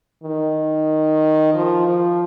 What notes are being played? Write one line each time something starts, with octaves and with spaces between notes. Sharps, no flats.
D#3
F3
F3